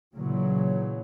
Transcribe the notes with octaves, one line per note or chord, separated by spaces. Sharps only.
A#2 C#3 E3 F#3